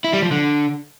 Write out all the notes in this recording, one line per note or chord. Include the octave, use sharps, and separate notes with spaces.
E4
G3
F3
D3